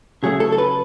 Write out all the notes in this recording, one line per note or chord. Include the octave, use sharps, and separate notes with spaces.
C#3 F#3 A3 G#4
A4
A4
B4